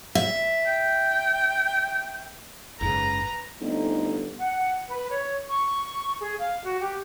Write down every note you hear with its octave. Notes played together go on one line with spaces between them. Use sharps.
E5
G5
F#1 G#2 C#3 B4 A#5
G1 A3 C4 D#4
F#5
B4
C#5
C#6
G#4
F5
F#4
G4